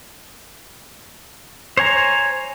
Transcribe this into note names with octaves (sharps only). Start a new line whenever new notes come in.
C5 C#5 G#5 A#5